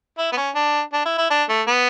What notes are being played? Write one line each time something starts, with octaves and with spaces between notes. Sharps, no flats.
E4
B3
C#4
D4
D4
E4
E4
D4
A3
B3